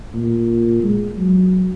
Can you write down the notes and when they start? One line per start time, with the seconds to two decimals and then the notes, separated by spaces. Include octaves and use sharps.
0.14 A#2
0.83 G#3
1.16 F#3